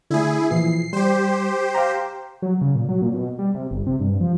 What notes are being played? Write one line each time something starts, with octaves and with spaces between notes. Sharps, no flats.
D3 A3 E4 G#4
A#2 E3 F3 C7
G3 G4 C5
F5 G5 A#5
F#3
C#3
A#2
F#3
A#2
B2
G3
C3
G1
C3
G2
F3